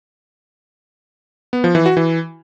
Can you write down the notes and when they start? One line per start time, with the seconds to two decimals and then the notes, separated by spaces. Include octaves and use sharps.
1.53 B3
1.64 F3
1.75 E3
1.86 F#4
1.97 E3